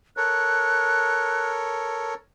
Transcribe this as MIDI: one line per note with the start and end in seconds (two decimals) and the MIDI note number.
0.17 2.14 69
0.17 2.14 70
0.17 2.14 73
0.17 1.51 90